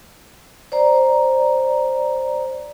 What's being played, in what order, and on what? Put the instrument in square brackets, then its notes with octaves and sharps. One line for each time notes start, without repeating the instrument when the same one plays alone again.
[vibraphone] C5 D5 A#5